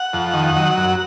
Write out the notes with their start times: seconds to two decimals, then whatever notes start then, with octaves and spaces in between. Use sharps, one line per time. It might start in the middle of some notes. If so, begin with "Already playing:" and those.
Already playing: F#5
0.13 F2
0.34 D#3
0.57 F#3
0.77 F#2